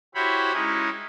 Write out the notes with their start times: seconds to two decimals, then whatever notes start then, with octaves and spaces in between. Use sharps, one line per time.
0.15 E4 F#4 G4 C5 C#5 B5
0.53 G#3 C#4 D#4 E4